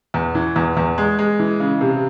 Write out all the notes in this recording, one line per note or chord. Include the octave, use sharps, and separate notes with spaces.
E2
E3
E2
E2
G#3
G#3
E3
C#3
C3